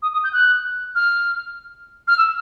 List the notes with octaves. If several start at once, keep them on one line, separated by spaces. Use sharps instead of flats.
D#6
D#6
G6
F#6
F6
F6
E6